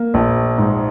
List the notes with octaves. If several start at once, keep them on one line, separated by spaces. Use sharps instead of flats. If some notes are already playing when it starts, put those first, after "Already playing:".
Already playing: A#3
A#1
G#2